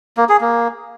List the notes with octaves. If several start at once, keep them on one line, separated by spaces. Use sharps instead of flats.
A#3
G#4
A#3